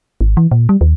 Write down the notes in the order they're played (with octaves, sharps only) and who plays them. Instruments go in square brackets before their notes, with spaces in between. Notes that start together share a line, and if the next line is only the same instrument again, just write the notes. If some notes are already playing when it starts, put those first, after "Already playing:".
[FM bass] G#1
E3
A#2
G3
D#2